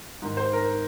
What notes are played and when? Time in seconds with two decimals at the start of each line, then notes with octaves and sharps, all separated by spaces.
0.22 G#2 D#3
0.37 C5
0.53 A#4